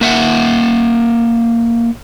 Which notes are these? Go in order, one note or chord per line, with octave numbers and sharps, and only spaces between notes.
A#3 E5 F#5